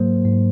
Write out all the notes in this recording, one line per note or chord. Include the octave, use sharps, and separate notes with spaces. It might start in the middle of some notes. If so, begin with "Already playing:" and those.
Already playing: G#2 F#3 A#3 C5
G#2